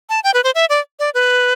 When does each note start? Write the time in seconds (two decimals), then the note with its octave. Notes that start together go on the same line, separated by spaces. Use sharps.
0.09 A5
0.24 G5
0.34 B4
0.44 C5
0.55 E5
0.70 D5
0.99 D5
1.14 B4